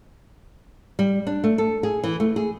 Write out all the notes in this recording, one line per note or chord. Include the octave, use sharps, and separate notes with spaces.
G3
D4
A3
A4
G#4
E3
A3
G#4